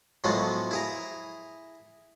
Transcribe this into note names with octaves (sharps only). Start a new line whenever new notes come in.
A2 F3 F#3 G#3 B3 F4
E4 G#4 A#5